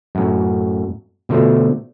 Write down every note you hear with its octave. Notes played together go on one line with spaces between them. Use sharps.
F#2 A2
B2 D3 F3 A3